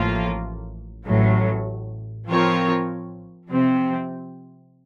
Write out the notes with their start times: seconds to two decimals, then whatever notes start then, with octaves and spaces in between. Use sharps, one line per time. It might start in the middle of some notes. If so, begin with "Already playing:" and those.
Already playing: A1 A2 F3 A#3 F4
1.06 A1 A2 F#3
2.27 F3 C4 F4 A#4 C#5
3.49 C3 F3 C4